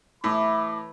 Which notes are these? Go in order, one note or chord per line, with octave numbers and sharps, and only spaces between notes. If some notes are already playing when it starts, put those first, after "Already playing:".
A2 E3 B4 B5 C#6 D6